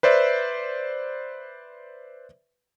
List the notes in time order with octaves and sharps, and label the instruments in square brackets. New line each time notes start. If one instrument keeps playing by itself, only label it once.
[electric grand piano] B4 C5 D5 E5